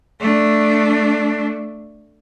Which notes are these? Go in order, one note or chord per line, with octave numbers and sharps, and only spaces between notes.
A3 D4